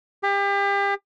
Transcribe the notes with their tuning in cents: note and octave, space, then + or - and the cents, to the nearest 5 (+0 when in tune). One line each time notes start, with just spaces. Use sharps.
G4 +35